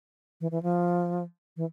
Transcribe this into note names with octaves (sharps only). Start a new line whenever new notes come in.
E3
E3
F3
E3